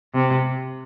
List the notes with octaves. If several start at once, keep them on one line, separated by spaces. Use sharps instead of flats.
C3